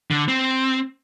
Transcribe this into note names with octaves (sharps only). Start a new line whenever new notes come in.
D3
C4